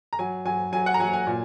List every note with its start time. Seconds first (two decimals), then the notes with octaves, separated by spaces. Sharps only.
0.13 A#5
0.19 F#3 G#5
0.45 F#3 G#5
0.72 F#3 G#5
0.86 F#5
0.94 A#5
1.00 F#3 G#5
1.13 G#5
1.27 A#2